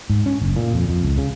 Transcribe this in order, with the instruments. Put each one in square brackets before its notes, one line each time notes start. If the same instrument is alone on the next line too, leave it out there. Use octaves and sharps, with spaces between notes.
[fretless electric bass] G#2
C#4
F#1
A#2
F2
F2
C#2
C#3